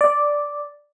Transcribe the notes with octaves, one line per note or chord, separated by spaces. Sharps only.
D5